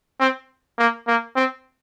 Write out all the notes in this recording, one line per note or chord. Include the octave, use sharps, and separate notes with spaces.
C4
A#3
A#3
C4